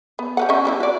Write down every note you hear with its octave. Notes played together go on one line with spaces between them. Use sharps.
B3
G4 B4 F#5
C#4 D#5 E5
G3 D4 E4
F#4 D5